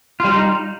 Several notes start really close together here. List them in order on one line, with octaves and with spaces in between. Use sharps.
F4 G3 D#4